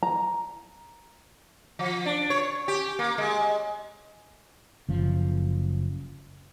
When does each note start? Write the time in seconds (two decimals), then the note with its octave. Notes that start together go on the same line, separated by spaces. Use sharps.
0.03 A#5
1.79 F3
2.05 D4
2.30 C#5
2.68 G4
2.99 A#3
3.18 G#3
4.89 F#1 F3